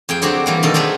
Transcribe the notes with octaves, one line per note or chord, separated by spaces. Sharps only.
F2 G#4 G5
D3 F#3 C4 F#4 G4
E3 G3 A#3
B2 D#3 D#4 A4
F#3 C4 D4 D#4 G#4 B4